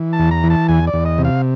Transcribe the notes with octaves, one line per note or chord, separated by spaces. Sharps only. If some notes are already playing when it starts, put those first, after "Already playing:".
Already playing: E3
A5
E2
A#5
E3
A5
E2 G#5
D5
E2
D#5
C3
F5